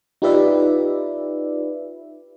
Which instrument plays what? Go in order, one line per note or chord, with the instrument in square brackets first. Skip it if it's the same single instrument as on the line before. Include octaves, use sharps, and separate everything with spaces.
[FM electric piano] D#4 F4 G4 B4 D5 E5